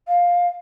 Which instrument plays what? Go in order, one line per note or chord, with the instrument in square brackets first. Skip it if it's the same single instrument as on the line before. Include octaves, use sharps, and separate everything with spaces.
[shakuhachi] F5